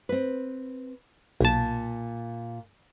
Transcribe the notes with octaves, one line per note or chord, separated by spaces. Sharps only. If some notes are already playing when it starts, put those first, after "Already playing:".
C4 B4
B1 A#2 A5